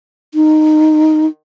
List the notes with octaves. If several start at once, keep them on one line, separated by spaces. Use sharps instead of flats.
D#4